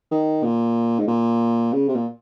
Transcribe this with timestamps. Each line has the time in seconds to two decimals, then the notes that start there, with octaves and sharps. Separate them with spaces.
0.11 D#3
0.44 A#2
0.99 G#2
1.08 A#2
1.73 C#3
1.88 C3
1.95 A#2